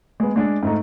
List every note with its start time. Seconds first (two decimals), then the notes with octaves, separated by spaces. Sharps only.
0.20 G#3 B3
0.36 G#3 D4
0.63 G#2 A3 D#4